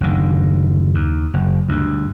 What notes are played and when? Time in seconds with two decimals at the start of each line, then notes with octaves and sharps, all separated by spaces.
0.01 F#1 D2 D#3
0.94 D#2
1.34 F#1
1.69 D2 G2